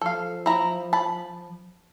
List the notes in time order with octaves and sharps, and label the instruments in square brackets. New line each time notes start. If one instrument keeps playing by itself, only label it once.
[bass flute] F3 [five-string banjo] A4 F5
[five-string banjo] E4 A#5
A5 B5